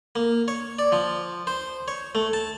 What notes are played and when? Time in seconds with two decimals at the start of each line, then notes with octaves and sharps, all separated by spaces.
0.16 A#3
0.48 C#5
0.79 D5
0.92 F3
1.47 C5
1.88 C#5
2.15 A3
2.33 A5